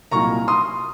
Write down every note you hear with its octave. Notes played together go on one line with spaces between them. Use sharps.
C2 A#2 F#3 A#3 D#4 A#5 C#6
C6 D#6